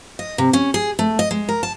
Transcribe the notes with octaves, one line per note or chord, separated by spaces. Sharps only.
D#5
C3
C#4
G#4
A3
D#5
G#3
A#4
A5